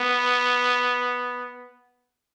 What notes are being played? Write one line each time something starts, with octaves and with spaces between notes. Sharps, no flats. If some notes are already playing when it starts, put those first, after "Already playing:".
Already playing: B3